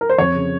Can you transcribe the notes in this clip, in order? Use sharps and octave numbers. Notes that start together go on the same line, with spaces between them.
A#4
C5
F2 C#5
C#3